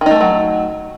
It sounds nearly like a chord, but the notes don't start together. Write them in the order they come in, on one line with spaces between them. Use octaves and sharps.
D#3 D#4 A3 E3 F#3